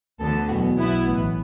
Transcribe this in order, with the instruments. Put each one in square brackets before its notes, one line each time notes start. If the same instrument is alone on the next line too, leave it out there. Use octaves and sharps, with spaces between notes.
[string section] D2 D3 B3 A4
E2 B2 F#3 B3 F#4
B1 B2 B3 E4
A1 A2 E3 B3